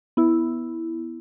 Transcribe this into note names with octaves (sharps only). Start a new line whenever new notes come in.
B3 E4